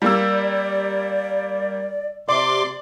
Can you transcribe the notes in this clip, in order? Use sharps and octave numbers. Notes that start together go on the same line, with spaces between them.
G3 A#3 D5 E6
C3 D5 C6 D6